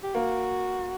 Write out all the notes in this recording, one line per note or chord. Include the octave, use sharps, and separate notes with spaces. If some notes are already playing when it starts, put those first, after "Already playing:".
G4
A#3 F#4